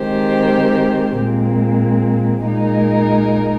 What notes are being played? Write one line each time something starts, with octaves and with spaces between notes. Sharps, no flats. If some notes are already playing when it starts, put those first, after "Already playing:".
Already playing: D#3 G#3 C4 G4 C5
A#2 G#3 C4
A#2 G#3 D#4 A#4